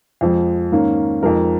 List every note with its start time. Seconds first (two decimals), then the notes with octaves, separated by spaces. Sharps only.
0.21 F2 F3 G#3
0.72 G#2 D#3 A#3 C#4
1.23 F2 F3 G#3 D#4 A#4